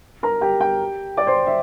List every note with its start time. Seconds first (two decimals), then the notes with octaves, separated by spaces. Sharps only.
0.23 A#4 A#5
0.41 G4 G5
0.60 G4 G5
1.17 D5 D6
1.27 C5 C6
1.47 E5